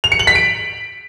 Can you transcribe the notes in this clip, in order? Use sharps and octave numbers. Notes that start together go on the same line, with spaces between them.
F7
C#7
F#7
B6
D7